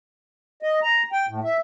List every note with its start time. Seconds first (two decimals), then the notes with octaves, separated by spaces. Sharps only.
0.62 D#5
0.83 A#5
1.12 G5
1.28 A2
1.44 E5